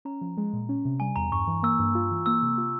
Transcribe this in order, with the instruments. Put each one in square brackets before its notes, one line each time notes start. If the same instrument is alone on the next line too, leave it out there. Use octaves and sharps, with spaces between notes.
[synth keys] C#4 [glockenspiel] A#5
[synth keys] F3
G#3
A#2
C#4
C3
[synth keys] G3 [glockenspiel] G#5
[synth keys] E2 [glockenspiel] A#5
[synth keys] G2 [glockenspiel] C#6
[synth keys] E3
[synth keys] A#3 [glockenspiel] E6
[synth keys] G2
F4
E3
[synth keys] A#3 [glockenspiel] E6
[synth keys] C3
F4